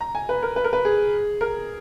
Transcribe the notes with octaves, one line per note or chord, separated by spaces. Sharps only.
A#5
G#5
B4
A#4
B4
A#4
B4
G#4
A#4